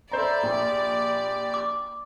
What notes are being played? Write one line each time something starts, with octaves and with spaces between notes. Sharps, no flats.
A4 C5 D5 E5 A#5 B5
A#1 G4 B5
D6